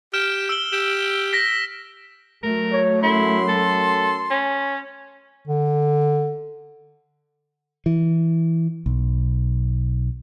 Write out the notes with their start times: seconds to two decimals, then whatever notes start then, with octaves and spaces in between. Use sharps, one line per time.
0.14 G4 F6 E7
0.49 E6 D7 G7
0.73 G4 E7
1.33 A#6 B6
2.43 F#3 A3 A#4
2.72 C#5
3.03 F#2 E4 C6
3.48 A4
4.30 C#4
5.47 D3
7.86 E3
8.86 B1